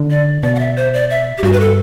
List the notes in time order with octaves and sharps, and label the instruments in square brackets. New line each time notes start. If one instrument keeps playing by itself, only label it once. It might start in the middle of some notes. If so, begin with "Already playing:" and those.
Already playing: [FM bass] D3
[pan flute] D5
[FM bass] B2 [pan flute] D5
[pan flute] F#5
E5
C5
D5
E5
G4
[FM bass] G2 [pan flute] F#4
[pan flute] B4
A4